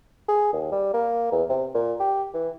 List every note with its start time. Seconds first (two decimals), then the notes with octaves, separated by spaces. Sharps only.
0.28 G#4
0.53 D#2
0.72 G3
0.93 A#3
1.32 E2
1.49 C3
1.74 A#2
2.00 G4
2.34 E3